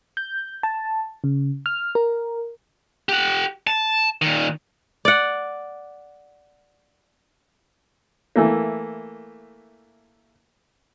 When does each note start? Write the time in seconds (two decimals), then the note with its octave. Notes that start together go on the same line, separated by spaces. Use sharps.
0.17 G6
0.63 A5
1.24 C#3
1.66 F6
1.95 A#4
3.09 G4 F#5
3.67 A5
4.22 A#2 D#3
5.05 D5 F#5
8.36 E3 A3 A#3